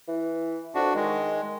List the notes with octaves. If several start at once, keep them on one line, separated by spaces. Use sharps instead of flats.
E3
F2 D4 F#4
D#3 G#3